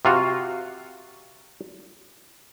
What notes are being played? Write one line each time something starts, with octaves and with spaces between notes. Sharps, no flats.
C3 F4 F#4